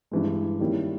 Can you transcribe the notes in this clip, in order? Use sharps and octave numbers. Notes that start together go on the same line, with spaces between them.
G2 E3 G#3
D#3 G3 A#3 C#4 E4